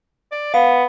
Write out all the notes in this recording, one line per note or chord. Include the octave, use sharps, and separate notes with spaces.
D5
B3 F5